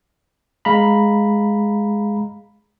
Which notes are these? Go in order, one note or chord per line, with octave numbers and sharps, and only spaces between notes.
G#3 F5 A#5 B5